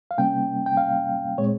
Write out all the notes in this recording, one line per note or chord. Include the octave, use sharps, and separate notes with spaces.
F5
C3 G3 A#3 C#4 G5
G5
F5
A#2 G#3 C4 C#5